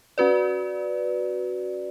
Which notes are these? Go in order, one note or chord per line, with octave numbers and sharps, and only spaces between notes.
C#4 F#4 B4 D5